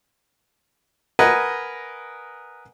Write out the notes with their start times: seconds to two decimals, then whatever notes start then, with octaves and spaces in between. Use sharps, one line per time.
1.19 A#4 B4 D#5 F#5 G#5